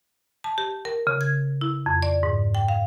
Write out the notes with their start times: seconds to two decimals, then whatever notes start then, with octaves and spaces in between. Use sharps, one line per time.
0.44 A5
0.58 G4
0.85 A#4
1.07 C#3
1.21 G#6
1.61 E4
1.86 F2
2.02 D5
2.23 G#2
2.55 G5
2.68 F5